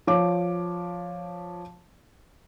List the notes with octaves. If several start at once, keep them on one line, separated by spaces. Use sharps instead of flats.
F3 C#5 D6